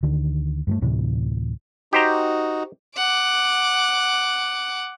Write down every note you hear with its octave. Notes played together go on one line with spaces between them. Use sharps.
D2 D3 D#3
G2 G3 A3
D2 A2 C3 E3
D#4 F#4 G4 C5 A#5
F#5 D6